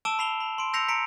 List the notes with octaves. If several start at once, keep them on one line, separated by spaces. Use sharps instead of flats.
A5 D6 E6 D7 E7 G7
B5 C7 F7 G7
B5
C6 D7
E6 G6 A#6 C7 C#7 F7
A#5 B6 C#7 D7